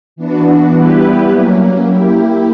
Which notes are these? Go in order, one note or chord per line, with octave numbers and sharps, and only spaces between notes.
E3 B3 D4 F#4
G3 B3 E4 G4 B4
F#3 A#3 C#4
A#3 E4 G4